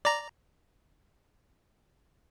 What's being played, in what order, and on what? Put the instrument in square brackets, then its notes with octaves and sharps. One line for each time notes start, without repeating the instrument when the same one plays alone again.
[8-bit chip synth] D5 A#5